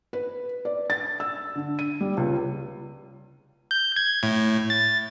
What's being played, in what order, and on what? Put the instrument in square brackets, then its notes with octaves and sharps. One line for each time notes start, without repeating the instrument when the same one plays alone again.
[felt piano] B4
D5
A6
E6
D3
D#7
G3
C#2
[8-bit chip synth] G6
G#6
A2
A6